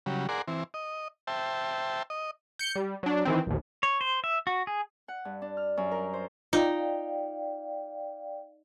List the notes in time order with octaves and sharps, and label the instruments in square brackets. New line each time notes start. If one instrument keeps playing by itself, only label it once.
[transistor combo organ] C#3 F#3 G3
G#4 A#4 D5 F#5 C6
E3 C4
D#5
C5 E5 G5 A5
D#5
[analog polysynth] G6 C#7
G3
F#3 D4
D#3 E3 C4
A#1 D#2
[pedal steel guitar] C#5
C5
E5
F#4
G#4
[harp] F#5
G2
D4
F6
F#2
A#4
C5
[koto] D#4 [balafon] F4 [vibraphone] D5 F5 G5